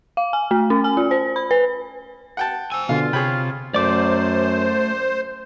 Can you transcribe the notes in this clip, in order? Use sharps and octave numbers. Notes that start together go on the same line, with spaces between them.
F5
G#5
A3
C#4
G#5
F4
C5
B5
B4
F#5 G5 A5
C5 G#5 E6
B2 D3 F4 F5
C3 G#4 C#5 G5 B5
F#2 A3 C5 D5 D6